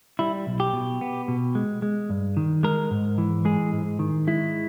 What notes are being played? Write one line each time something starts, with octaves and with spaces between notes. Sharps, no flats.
G3 E4
B1
G4
B2
B3
B2
G#3
G#3
G2
D#3
G#3 A#4
G#2
E3
G#3 G#4
G#2
D#3
G#3 E4